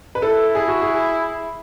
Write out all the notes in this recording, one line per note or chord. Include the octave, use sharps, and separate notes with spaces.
B4
E4 A4
G#4
F#4
G#4